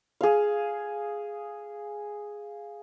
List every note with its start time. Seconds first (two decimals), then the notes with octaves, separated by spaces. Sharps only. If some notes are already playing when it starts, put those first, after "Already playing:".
0.21 G#4 F5